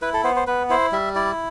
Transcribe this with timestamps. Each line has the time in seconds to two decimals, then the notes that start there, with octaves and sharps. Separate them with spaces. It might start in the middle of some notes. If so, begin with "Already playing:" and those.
0.02 E4 B4
0.14 A4
0.24 B3 C5
0.36 C5
0.47 B3 B4
0.70 E4 C5
0.92 G3 E5
1.15 E4 D5